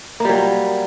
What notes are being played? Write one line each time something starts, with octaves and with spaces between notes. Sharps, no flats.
F#3 G3 A#3